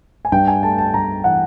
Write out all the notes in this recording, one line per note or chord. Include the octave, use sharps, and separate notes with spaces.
G#5
G2 G5
G#5
A3 A5
A5
G2 A#5
E3 F#5